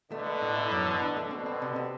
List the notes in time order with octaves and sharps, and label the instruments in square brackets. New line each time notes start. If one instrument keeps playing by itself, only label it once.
[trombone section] B2 D3 [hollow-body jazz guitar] A3
[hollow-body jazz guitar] A3
A2
E4
F#2
E3
D4
A3
[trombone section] B2 D3 [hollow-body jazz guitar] C4
[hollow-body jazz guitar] C4
C3
C3